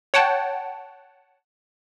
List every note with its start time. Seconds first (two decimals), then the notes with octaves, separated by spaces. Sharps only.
0.14 C#5 F#5 G5 A5